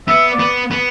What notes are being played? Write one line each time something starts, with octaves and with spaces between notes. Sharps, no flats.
B3 E5
D5
B3
B3